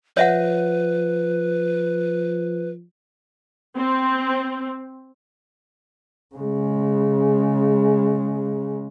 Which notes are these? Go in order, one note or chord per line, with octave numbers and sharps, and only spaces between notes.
F3 B4 C#5 E5 F#5
C4
C#3 G#3